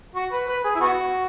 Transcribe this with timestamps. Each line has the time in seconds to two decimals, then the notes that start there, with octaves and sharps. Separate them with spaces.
0.15 F#4
0.32 B4
0.48 B4
0.64 G#4
0.75 E4
0.81 B3 F#4